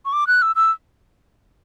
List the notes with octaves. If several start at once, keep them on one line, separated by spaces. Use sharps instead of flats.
C#6
D6
F#6
E6
E6